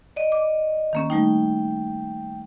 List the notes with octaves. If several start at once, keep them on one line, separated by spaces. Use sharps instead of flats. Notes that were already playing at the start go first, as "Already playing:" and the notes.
D5 D#5
D6
D#3 A#3 C#4
G3 A3 D#4 G5